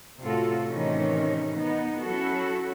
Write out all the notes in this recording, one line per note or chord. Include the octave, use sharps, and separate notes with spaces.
A2 C3 F4 F#4 A4
A2 C3 D#3 E3 C#4 D#4
B3 D#4
F#3 C#4 E4 F#4 A4